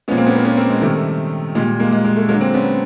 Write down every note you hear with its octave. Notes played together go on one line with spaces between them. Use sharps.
A#2 F3 G#3 B3 C#4
A#3 C4
B3 C#4
A#3 C4
B3 C#4
A#3 C4
G#3
C3 D#3 G3 A3
A#2 G3 G#3
G#3 A#3
G#3
G#3
A3
D3 F#3 G#3 A#3
A#3 C4
B3 C#4